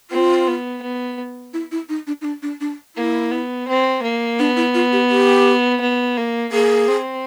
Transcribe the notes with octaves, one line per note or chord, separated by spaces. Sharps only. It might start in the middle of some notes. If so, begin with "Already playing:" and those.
C4 F4
B3
B3
E4
E4
D#4
D4
D#4
D4
D4
D4
A#3 E4
B3
C4
A#3
B3 D4
E4
F4
G4
G4
B3
A#3
A#3 G#4
C4